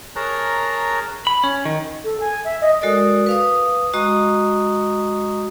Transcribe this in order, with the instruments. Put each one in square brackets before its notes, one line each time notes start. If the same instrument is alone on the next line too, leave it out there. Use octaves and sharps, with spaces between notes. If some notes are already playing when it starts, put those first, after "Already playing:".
[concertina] G#4 A#4 C#5 A5 A#5 F#6
[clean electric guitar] B5
C#4
D#3
[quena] A4
G#5
E5
D#5
[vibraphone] G#3 F#4 A4 A#4 D5 D#6
B4 F5 D#6
G#3 F#4 D#5 A#5 C#6 D#6